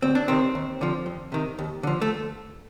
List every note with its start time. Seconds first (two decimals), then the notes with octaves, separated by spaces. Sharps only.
0.02 D2 C4
0.15 D4
0.28 C3 D#3 C4
0.55 D#2
0.81 D3 F3
1.06 F2
1.32 C3 D#3
1.59 D#2
1.83 D3 F3
2.02 A3